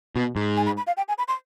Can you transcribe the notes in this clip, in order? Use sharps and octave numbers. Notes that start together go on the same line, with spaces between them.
B2
G#2
G#5
B5
B5
F5
G5
G#5
B5
C6